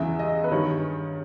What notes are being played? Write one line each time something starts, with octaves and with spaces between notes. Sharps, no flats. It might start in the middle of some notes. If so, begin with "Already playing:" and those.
Already playing: E2 C#3 E3 E5
D#5
B4
G2 D#3 C#5